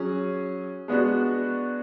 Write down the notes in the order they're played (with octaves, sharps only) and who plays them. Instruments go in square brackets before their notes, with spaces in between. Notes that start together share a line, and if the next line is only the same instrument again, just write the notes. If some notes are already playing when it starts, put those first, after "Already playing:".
Already playing: [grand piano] F#3 C#4 G#4
G#3 B3 D4 F#4